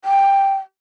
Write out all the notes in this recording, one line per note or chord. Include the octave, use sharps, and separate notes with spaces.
G5